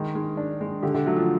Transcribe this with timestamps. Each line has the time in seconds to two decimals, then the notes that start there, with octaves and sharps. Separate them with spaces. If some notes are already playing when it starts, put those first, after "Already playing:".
Already playing: D#3 G#3
0.15 G#3
0.37 D4
0.61 G#3
0.83 D3 G4
0.94 D3
1.06 F#3 A3
1.17 F3